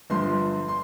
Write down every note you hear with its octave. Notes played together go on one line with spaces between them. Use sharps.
G1 G2 F3 C6
C6